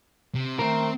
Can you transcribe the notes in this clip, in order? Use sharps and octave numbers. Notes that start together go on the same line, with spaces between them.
C3
D#3 A3 C4 A#4